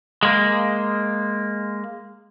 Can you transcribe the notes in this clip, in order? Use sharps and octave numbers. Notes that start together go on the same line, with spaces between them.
G#3 A#3